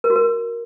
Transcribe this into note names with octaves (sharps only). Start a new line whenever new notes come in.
A#4
F#4
A#4